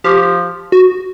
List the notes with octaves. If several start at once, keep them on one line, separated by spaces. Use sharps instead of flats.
F3 G4
F#4